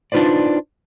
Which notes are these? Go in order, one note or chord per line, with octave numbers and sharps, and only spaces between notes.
D4 D#4 F4 B4 C5 D5